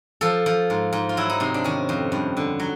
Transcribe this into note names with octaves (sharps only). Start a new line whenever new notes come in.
F3 A4
F3
G#2
G#2
F4
F#3 E4
D#4
C3 D#4
D4
D#3 C#4
F2
G2
D3
F#3